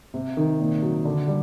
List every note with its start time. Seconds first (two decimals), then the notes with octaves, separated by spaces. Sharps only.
0.14 C3
0.37 D#3
0.60 A#2
0.82 F#3
1.05 D3
1.28 G3